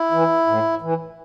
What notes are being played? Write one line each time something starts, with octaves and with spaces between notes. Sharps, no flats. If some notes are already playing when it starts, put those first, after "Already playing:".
Already playing: E4
E3
A2
E3